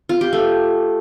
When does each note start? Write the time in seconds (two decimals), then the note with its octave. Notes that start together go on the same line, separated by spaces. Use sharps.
0.09 F4
0.21 G4
0.33 A3